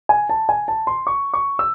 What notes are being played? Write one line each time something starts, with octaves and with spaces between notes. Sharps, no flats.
G#5
A5
G#5
A5
C6
C#6
C#6
E6